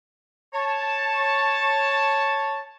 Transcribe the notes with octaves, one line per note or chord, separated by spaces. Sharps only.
C#5 A5